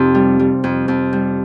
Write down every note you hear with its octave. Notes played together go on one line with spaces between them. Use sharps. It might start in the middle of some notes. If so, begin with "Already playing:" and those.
Already playing: F2 C3 C4 D#4
G3
G3
F2
F2
G3